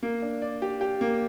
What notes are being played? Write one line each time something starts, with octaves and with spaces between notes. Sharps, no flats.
A#3
D4
D5
G4
G4
A#3